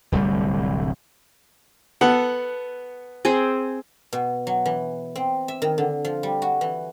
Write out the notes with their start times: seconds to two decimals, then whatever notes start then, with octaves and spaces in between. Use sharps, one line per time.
0.12 D1 C2 D3 G3
2.01 B3 A4 F#5
3.25 C4 G#4 C5
4.13 B2
4.47 F#3
4.66 E3
5.16 C4
5.48 E5
5.62 D#3
5.78 D3
6.05 F3
6.23 G3
6.42 F#4
6.61 E3